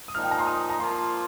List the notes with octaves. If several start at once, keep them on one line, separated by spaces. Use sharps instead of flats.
D#6
A#2 F3 D#4 F6
G5
A#5
C6
D#6
A#5
F3 A#3 F4 C6